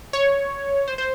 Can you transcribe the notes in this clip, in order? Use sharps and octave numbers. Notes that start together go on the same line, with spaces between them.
C#5
C5
C5